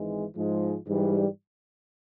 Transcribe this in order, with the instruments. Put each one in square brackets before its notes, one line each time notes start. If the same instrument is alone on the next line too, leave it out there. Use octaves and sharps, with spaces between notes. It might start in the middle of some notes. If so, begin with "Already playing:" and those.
Already playing: [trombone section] G#1 G#2 E3 G#3
G#2 F3 G#3
G#2 E3 G3